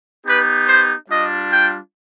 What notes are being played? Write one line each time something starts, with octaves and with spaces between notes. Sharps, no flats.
B3 D#4 G4 B4
C5
G3 D4 F4 D#5
G5